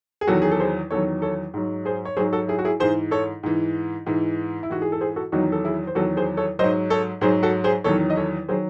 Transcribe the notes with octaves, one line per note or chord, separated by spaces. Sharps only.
G#4
E2 D#3 F#3 F#4 A4
G#4
A4
G#4 C5
E2 D#3 F#3 A4 C#5
A4 C#5
G#2 F#3
G#4 C5
C#5
G#2 F#3 G#4 C5
F#4 A4
E4 G#4
F#4
E4 G#4
G#2 E3 G#4 C5
A4 C#5
G#2 E3
G#2 E3
E4
G#2 E3 F#4
G#4
A4
G#4 C5
F#4 A4
E2 D#3 F#3 D#4 F#4
A4
E4 G#4
C5
E2 D#3 F#3 F#4 A4
G#4 C5
A4 C#5
G#2 F#3 C5 D#5
A4 C#5
G#2 F#3 G#4 C5
F#4 A4
G#4 C5
E2 D#3 F#3 A4 C#5
D#5
A4 C#5
D#3 F#3 G#4 C5